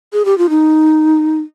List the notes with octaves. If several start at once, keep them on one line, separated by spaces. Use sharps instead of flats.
G#4
G4
F4
D#4